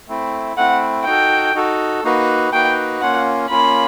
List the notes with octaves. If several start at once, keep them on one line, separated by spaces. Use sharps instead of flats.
A3 C4 E4
A3 C4 E4 F#5
D#4 F#4 A4 G5
D#4 F#4 A4
A#3 D#4 F#4 B4
A#3 D#4 F#4 B4 G5
A#3 C#4 F4 F#5
A#3 C#4 F4 B5